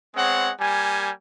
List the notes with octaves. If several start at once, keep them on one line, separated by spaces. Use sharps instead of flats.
G#3 B3 C4 C#5 F#5
G3 A#3 G#5